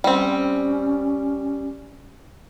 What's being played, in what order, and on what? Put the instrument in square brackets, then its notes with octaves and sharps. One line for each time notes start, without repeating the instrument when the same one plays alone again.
[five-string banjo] G3 C4 [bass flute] C#4